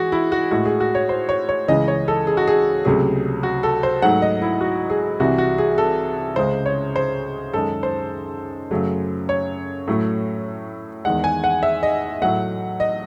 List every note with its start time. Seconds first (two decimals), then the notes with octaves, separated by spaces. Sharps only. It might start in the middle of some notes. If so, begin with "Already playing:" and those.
Already playing: E3 G#3 F#4 G#4
0.12 E4
0.32 F#4
0.51 A2 G#3 F#4
0.66 G#4
0.80 F#4
0.95 C#5
1.09 C5
1.29 C#5
1.49 C#5
1.68 C#2 C#3 E3 G#3 D#5
1.88 C#5
2.08 A4
2.27 G#4
2.37 F#4
2.47 G#4
2.85 C#2 C3 F#3 A3 G#4
3.43 F#4
3.63 A4
3.83 C5
4.02 G#2 F#3 A3 F#5
4.22 D#5
4.42 E4
4.61 F#4
4.90 G#4
5.20 C2 C3 E3 F#4
5.38 F#4
5.58 G#4
5.78 A4
6.36 C#2 C#3 G#3 C5
6.66 C#5
6.96 C5
7.53 F#2 D#3 G#3 A4
7.83 C5
8.71 F#2 C#3 F#3 A3
9.29 C#5
9.88 A2 F#3 A3
11.05 E2 D#3 G#3 F#5
11.24 G#5
11.44 F#5
11.63 E5
11.83 D#5
12.22 A2 F#3 A3 F#5
12.80 D#5